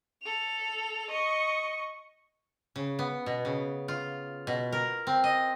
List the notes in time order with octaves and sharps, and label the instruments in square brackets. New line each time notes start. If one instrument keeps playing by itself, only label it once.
[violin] A4 F7
D#5 C#6
[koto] C#3
B3
B2
C#3
F4
B2
A#4
C4
D#5